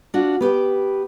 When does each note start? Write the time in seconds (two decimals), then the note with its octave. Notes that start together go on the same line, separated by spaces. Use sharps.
0.14 D4 F4 F#4
0.41 B3 G4 B4 G5